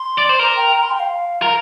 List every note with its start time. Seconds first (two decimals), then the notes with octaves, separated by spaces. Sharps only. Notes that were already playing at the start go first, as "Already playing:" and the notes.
Already playing: C6
0.18 D5
0.29 C5
0.39 A#4 A#5
0.57 G5
0.74 A#5
0.83 C6
0.91 G5
1.00 F5
1.42 A#4 F5